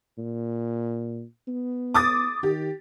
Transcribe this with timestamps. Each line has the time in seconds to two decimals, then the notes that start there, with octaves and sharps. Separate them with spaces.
0.18 A#2
1.48 B3
1.94 D6 D#6 A6
2.43 D#3 G4